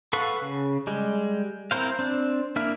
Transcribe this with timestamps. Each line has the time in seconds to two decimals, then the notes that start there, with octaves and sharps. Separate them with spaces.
0.13 A4 B4 F5 F#5 C#6
0.42 C#3
0.87 G3 G#3
1.71 C4 E4 A#4 C5 F5
1.99 C4 D4
2.56 A#3 D4 E4 E5 F6